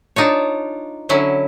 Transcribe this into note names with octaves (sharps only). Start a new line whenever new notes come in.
D4 D#4 F4 C#5
D3 F#3 C#4 E4